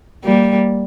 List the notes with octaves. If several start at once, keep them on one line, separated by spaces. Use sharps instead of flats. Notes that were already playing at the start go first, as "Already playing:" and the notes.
G3 A#3